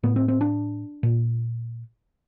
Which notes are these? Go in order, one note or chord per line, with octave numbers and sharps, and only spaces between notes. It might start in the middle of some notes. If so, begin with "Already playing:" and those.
A2 B3
C4
C4
D4
A#2